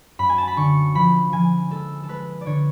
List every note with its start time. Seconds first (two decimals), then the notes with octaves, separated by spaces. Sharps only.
0.19 F#2 B5
0.29 G#5
0.38 A5
0.48 B5
0.57 D3 C#6
0.95 F3 B5
1.33 F3 G#5
1.70 G#3 A4
2.03 A4
2.09 G#3 B4
2.41 D5
2.46 D3 C#5